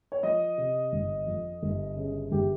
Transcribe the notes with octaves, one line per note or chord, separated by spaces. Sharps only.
C#5
F3 D#5
C3
G1
F2
G1
C#3
G1 G4